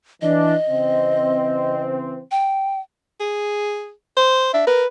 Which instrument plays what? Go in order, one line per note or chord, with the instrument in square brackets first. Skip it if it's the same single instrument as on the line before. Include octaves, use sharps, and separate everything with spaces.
[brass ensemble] E3 D4 [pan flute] D#5
[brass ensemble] C#3 E3 C4
[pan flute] G5
[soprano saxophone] G#4
C5
[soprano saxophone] D4 [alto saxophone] E5
[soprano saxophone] A#4 [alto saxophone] B4